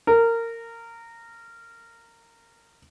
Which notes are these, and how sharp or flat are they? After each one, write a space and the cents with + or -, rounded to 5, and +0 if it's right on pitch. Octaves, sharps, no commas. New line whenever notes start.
A#4 -20